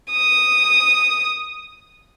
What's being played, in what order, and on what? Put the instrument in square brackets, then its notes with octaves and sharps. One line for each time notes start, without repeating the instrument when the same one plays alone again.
[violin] D#6